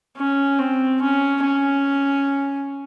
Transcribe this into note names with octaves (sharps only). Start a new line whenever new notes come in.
C#4
C4
C#4
C#4